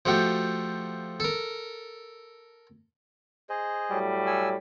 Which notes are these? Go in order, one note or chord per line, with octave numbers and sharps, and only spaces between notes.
F3 A3 F#4 G4
A4 A#4
G#4 C5 D#5
A2 F#3 G3
G#5 E6